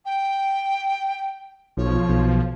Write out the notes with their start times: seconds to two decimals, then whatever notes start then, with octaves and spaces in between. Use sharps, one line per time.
0.05 G5
1.77 B1 F3 C#5
2.09 B1